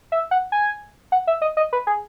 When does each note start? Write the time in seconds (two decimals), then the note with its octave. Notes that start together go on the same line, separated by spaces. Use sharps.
0.12 E5
0.31 F#5
0.52 G#5
1.12 F#5
1.27 E5
1.42 D#5
1.57 D#5
1.73 B4
1.87 G#4